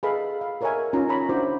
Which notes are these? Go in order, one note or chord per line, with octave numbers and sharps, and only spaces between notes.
G#4 A4 B4 D#5 F5 B5
F5
A4 A#4 C#5 D#5 E5 G#5
C#4 D#4 F4 A#5
C#5 A#5 B5
D4 E4 F#4 C5 D6